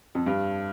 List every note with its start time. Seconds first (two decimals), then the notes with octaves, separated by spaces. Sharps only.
0.15 F2
0.26 G2